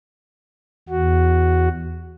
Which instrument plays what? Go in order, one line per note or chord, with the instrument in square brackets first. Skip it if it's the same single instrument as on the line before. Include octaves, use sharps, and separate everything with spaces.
[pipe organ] E2 F#4